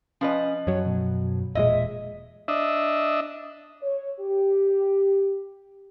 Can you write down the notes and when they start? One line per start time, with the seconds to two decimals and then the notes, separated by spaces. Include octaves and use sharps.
0.21 F3 C#4 B4 D#5
0.67 F#2 F#3 C#5
0.86 B2
1.55 E1 A#2 G#3 D#5 E5
2.48 D4 D#5 E5
3.82 C#5
4.20 G4